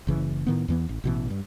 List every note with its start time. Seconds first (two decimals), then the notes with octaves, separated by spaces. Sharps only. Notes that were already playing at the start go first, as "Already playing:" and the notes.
0.07 F#1 C#3 E3
0.47 A2 D#3 B3
0.68 E2 E3 B3
0.89 A1
1.04 A1 B2 E3
1.30 G2